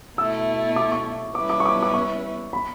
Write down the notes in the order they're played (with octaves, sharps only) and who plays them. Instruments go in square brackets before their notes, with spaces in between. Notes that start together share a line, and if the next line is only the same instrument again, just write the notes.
[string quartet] B2 A3 E4 [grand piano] E6
[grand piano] D6
C#6
[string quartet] G3 C#4 E4 B4 [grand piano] D6
[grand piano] D6
C#6
D6
D6
C#6
B5